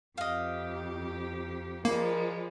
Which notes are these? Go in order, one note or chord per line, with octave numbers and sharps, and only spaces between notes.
F2 G4 D#5 F5
F3 G3 G#3 A#3 A#4